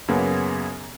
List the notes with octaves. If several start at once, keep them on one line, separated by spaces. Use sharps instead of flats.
F#2 C#3 A#3 B3